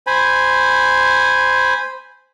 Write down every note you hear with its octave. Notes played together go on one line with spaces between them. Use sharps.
C5 G#5 B5